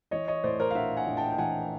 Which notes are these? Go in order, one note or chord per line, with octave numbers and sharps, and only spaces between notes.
E3 C#5 D#5
C#5 D#5
A2 C5 D5
A#4 C5
F5
A#1 E5 F#5
F#5 G#5
A#1
G5 A5
G5
E3 F#5 G#5